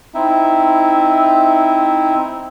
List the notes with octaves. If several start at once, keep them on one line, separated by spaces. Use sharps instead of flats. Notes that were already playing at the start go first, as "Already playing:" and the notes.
C4 D#4 E4 E5